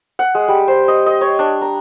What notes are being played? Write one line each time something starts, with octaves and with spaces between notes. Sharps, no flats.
F#5
G#3
G3
C5
D#5
D#5
C#5
D4
A#5